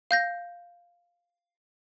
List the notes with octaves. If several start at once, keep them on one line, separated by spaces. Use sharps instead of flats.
F5 G6 A#6